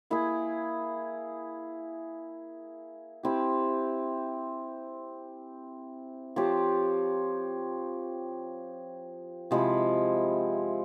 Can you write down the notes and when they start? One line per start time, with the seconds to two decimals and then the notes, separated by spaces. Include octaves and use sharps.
0.10 A#3 E4 G#4
3.23 C4 E4 G4
6.36 F3 C4 G4 C#5
9.51 C3 F3 G#3 E4